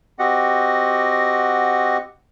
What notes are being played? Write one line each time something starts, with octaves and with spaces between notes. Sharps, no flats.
C4 F#4 G4 D#5 F#5